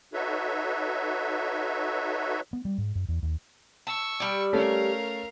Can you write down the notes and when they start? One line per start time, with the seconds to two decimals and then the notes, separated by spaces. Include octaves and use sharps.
0.13 D#4 F#4 A4 B4 C#5 E5
2.53 B3
2.65 G3
2.78 G#2
2.95 F#2
3.08 E2
3.23 D#2
3.87 A5 C#6 E6
4.20 G3 D5
4.53 A3 C#4 A#4 F5